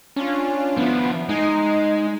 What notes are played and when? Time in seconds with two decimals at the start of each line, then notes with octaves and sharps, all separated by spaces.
0.16 C#4 D4 F4
0.77 F3 B3 E4
1.29 G#3 D#4 D#5 G#5